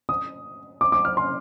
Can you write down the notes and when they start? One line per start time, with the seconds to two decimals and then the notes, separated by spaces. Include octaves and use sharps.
0.09 D#6
0.81 D6
0.92 D6
1.05 F6
1.17 C6